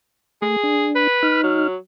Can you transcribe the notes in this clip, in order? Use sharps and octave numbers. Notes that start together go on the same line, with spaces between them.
A3 G#4
D4
B4
D#4 F6
F#3